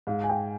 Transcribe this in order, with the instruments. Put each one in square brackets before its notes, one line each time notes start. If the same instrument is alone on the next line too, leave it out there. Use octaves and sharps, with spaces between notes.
[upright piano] G#2 [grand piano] F5
[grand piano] G#5
G5